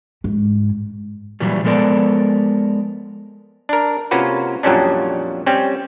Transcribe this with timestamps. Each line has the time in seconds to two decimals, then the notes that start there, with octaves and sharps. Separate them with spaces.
0.24 G#2
1.40 A#2 E3 F#3 G3
1.64 F3 G#3 B3 A4 A#4 D5
3.69 D4 A#4
4.11 C3 A#3 C#4 F4 F#4 B4
4.63 F2 A#2 F#3 G3 C#4 D4
5.46 G3 C4 C#4